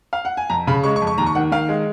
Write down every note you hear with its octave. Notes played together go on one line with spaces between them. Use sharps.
F5
F#5
G#5
F2 A#5
C#3 B5
G#3 C#6
C#6
F2
C#6
D#2 A#5
C#6
D#3 F#5
D#3 F5
G#3